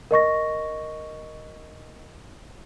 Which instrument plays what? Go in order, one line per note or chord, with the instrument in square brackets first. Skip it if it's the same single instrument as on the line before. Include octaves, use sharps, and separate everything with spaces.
[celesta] A#4 D#5 C#6 A#6